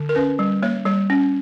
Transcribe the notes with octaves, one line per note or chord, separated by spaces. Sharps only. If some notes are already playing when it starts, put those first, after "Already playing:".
Already playing: D3
A#4
C#4 B4
G3
A#3 C#5
G3 C#5
C#4